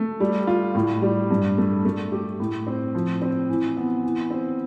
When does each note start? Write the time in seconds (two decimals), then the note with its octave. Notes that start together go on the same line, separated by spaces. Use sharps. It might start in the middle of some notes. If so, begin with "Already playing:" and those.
Already playing: A3
0.20 G3
0.47 F4
0.75 A2
1.02 G3
1.31 G2
1.58 A3
1.85 A3
2.12 G4
2.40 A2
2.67 C4
2.95 F3
3.22 C4
3.50 E3
3.77 B3
4.04 E3
4.31 C4